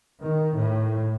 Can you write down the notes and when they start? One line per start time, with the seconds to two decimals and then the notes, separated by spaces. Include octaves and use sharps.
0.22 D#3
0.54 A2